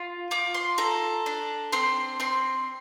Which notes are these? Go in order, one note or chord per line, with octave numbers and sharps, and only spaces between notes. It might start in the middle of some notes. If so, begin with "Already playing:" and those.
Already playing: F4
F4 D6
C6
A4 A#5
D4
C4 C6
C4 C6